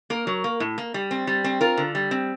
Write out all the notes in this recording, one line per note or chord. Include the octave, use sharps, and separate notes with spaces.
A#3 A#4
F#3
A#3
A2
A#3
G3
C4
G3
C4
F4 A#4
D3
G3
C4